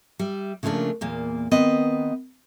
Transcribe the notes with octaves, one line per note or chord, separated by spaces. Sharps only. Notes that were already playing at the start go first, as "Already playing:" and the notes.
G3 E5
C#3 F3 A3 A#3 D4
E2 A#2 A#3
D#3 B3 C4 B4 D#5